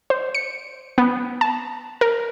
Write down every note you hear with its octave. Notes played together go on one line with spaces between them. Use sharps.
C5
C#7
B3
A5
A#4